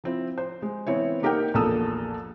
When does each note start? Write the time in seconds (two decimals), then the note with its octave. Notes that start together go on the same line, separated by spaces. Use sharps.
0.04 F3 C4 E4
0.38 C5
0.62 G#3
0.87 E3 B3 C4 E4 C#5
1.22 A#3 D#4 G4 A#4 F#5 G5
1.54 A#1 E2 A#3 A4 D#6 E6